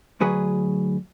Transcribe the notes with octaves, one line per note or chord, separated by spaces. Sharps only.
D2 F#3 G#4 B4